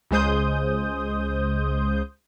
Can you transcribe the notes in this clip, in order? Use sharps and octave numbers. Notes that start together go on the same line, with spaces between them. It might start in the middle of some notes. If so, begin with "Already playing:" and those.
C#2 C#3 G#3 C5 D#6 G6